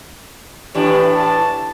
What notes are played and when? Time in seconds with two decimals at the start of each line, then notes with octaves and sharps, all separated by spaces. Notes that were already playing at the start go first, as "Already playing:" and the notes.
0.75 A2 E3 D4 G4
1.16 A5